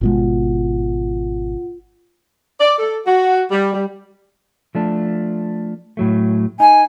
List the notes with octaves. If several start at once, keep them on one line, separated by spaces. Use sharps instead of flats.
G#1 B2 G#3 F4 F#5
D5
A4
F#4
G3
G3
F3 A3 D4
A2 F#3 A3
D#4 G#5